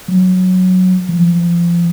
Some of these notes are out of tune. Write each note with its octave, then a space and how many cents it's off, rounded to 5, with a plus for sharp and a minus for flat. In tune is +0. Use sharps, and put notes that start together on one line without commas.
F#3 -5
F3 -25